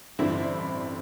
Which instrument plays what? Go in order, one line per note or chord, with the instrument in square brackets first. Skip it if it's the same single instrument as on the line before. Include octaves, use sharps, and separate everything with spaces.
[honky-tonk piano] A1 G2 D3 C4 E4